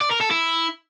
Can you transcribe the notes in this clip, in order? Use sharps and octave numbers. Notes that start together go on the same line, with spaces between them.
D5
A#4
A4
E4